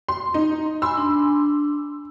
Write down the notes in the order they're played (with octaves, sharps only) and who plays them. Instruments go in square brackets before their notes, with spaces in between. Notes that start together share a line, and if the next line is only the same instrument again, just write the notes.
[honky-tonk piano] C6
D#4
[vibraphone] G#5 B5 [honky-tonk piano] C6 E6
[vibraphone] D4